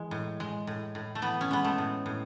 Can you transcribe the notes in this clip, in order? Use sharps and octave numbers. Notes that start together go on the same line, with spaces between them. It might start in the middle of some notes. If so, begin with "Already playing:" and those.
Already playing: E3 G#3
A2
G#3
A2
A2
A3
E3 B3
C#4
G#3 B3
A3
A2
A2